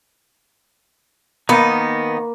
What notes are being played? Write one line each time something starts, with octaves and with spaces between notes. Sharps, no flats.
D#3 A#3 B3 D#4